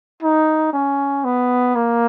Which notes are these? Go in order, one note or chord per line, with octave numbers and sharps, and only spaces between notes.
D#4
C#4
B3
A#3